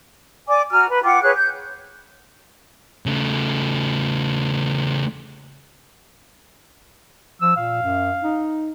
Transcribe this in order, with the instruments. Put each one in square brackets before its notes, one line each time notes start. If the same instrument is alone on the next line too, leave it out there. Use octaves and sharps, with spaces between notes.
[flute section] D5 G#5 D6
F#4 G#5 A#5 F6
B4
F4 F#5 G5 D6
G#4 B4 C#5 F#6
G6
[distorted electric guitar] C#3 A3
[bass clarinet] F3 [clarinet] E6
[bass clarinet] A#2 [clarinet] F5
[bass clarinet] F#2
D#4